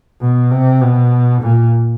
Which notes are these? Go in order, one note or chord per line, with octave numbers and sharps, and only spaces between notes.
B2
C3
B2
A#2